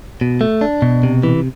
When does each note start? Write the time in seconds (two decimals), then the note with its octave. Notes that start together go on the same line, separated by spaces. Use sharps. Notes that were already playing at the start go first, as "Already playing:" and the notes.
0.21 B2
0.41 A3
0.61 D4
0.82 B2
1.03 C3
1.23 E3